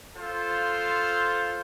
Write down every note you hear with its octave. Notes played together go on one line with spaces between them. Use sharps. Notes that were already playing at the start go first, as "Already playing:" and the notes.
F4 A4 C5